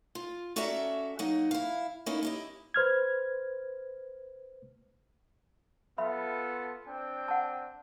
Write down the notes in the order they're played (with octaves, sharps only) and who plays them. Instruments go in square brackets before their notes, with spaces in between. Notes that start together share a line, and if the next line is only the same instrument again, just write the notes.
[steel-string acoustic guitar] F4
C#4 F#4 A4 D5 E5 A#5
F#3 A#3 D#4 F#5
E4 F5
A#3 C#4 D#4 E4 G#4
E4 G4 D#5
[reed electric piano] B4 C5 F6 G#6
[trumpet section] B3 F4 A4 [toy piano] E5 B5
[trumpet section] C4 D4 G5
[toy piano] F#5 A5